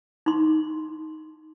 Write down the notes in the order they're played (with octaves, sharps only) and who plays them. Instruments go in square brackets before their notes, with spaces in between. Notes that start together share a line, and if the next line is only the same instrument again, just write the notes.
[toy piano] D#4 C6